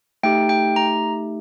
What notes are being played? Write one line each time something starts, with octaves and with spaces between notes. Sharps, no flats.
A3 D#4 G4 G5
G5
A#5